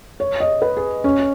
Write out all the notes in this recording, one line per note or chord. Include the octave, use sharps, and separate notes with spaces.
C#5
D#5
B4
G#4
C#4